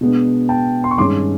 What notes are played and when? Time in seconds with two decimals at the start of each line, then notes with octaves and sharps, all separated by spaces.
0.01 B2 G#3 B3 D4
0.49 G5 A5
0.84 C6
0.91 C#6
0.98 G2 D#3 G#3 C#4 C6 D6